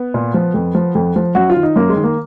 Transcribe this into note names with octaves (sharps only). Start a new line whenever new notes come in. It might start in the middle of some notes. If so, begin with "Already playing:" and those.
Already playing: B3
A#2
F3
F2
F3
F2
F3
F#2 F#4
F4
D#3
D#4
F#2 A#3
G#3
D#3
A#3